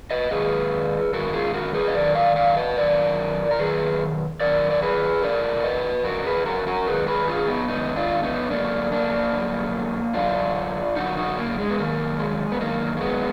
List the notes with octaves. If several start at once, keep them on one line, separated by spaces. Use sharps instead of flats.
B4 D#5
G#2 D#3 G#4 B4
G#2 D#3 F#4 A#4
F4 G#4
F#4 A#4
G#4 B4
D#5
F#2 D#3 A#4 D5
D5 F5
D5 F5
B4 D#5
F#2 D#3 A#4 D5
A#4
F#2 D#3 G#4 B4
F#2 D#3 A#4 D5
D5
G#4 B4
F2 D3 A#4 D5
B4 D#5
F2 D3 F#4 A#4
G#4 B4
F#4 A#4
F#4 A#4
G#2 D#3 G#4 B4
G#4 B4
F4 G#4
B3 D#4
G#2 D#3 B3 D#4
D4 F4
B3 D#4
F#2 D3 A#3 D4
A#3 D4
F#2 D3
F#2 D3 D4 F4
F#2 D3 D#4 F#4
D#4 F#4
A#3
G#3
B3
F#2 D#3 A#3
G#3
B3
F#2 D#3 A#3
A#3
G#3 B3